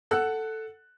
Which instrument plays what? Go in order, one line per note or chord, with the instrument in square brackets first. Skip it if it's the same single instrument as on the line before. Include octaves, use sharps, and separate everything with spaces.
[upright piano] A4 F#5 E6 F#6